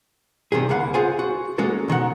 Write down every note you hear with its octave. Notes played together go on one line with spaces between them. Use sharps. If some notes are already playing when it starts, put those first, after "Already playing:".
C3 D#3 G3 G#4
C#2 A#3 F5 F#5 B5
F4 G#4 C5 F5 F#5 G#5
F#4
G#3 A#3 C#4 F#4 A4
B1 D#3 F#4 F#5